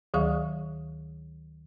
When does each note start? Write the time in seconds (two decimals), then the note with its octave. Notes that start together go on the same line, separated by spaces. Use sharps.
0.14 D2 D#3 F#3 G#4 F5 C#6